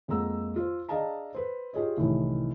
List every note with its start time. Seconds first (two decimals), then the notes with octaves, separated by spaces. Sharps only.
0.08 F2 G#3 A#3 F#5 A#5 E6
0.56 F4 C5
0.89 D4 G#4 D#5 F5 A5 A#5
1.35 B4 C5
1.73 F4 G4 G#4 C#5 D#5
1.97 C2 A2 C3 D#3 E3